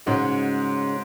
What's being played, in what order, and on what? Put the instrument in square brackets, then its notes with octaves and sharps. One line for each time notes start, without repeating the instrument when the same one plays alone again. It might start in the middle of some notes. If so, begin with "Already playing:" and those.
[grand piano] G#2 [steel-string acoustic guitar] C#3 G#3 C#4 F#4